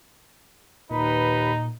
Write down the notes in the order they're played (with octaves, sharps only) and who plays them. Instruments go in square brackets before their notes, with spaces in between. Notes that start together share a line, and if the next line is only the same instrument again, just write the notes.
[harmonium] D#2 B4 [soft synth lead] A#2 [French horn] D#4